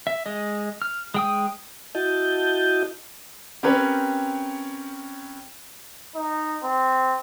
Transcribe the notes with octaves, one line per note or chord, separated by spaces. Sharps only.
E5
G#3 D#5
F6
G#3 G5 D#6
E4 F#4 D#5 A5 G6
C4 C#4 G4 A#4 B4 C#5
D#4
C4